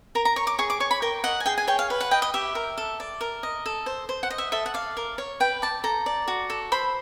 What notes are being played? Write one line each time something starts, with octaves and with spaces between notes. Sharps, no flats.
A#4 A#5
A#5
C#5 C#6
D6
G#4 C#6
D6
C#5 C#6
B5
A#4 G5
D#5 F#5
G#5
G#4 G5
G#5
C#5 G5
F5
B4
F#5
D#5 G5
D#5
G4 E5
A#4
A4
D5
A#4
D#5
A4
C5
C5
F#5
D#5
E5
A4 E5
F#5
D5 F5
A#4
C#5
B4 G5
D5 A5
A4 A#5
D5
F#4
A4
C5 B5